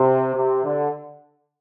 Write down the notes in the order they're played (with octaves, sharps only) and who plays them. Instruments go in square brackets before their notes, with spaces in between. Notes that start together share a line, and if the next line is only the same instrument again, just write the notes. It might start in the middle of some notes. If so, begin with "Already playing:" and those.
Already playing: [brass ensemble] C3
C3
D3